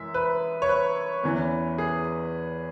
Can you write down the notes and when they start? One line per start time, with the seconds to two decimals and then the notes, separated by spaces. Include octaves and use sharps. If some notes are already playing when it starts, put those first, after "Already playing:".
Already playing: F#2 E3 G#3 E5
0.14 B4
0.62 C#5
0.69 B4
1.23 E2 E3 C#4
1.78 G#4